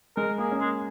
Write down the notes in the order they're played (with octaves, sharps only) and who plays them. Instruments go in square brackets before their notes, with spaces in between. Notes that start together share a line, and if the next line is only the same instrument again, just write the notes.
[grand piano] G#3 [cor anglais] A#4
[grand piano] A#3 [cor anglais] G#4
[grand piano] C#4
[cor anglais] G#3 [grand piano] A#3